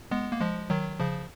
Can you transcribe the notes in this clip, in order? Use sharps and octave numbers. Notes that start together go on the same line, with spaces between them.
G#3 B3
A#3
F3 G#3
D#3 F#3
C#3 F3